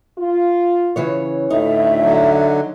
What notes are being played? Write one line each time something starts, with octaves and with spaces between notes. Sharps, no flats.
F4
C#3 E3 C#5
D2 A2 D#4 E5
D3 F#3